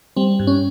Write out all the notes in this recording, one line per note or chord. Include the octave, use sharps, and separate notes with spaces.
G3 C4
G2
C#4